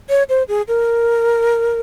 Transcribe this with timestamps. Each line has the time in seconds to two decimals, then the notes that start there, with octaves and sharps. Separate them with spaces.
0.10 C#5
0.29 C5
0.48 G#4
0.68 A#4